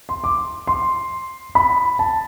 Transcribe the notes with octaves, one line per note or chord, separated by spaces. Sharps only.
C6
D6
C6
B5
A5